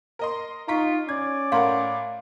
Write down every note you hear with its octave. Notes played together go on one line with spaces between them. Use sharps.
A#4 D#5 C6
D#4 F4 A#5 C#6 B6
C#4 D5 G#6
A2 A#4 F5 F#5 C6